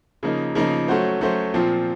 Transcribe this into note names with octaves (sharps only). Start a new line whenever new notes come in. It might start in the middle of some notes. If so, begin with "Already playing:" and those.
C#3 F3 A#3 D#4
C#3 F3 A#3 D#4
F#3 A3 C#4 F#4 C5
F#3 A3 C#4 F#4 C5
A#2 F3 C4 F4